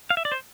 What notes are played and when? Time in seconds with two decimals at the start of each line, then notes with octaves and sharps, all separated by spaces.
0.10 F5
0.17 E5
0.25 D5
0.32 C5